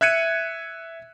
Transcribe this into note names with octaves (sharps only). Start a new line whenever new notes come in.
E5 F#6 G#6 C#7 D#7